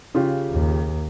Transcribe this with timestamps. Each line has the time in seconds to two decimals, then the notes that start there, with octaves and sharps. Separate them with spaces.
0.15 C#3 F4 G4
0.52 D#2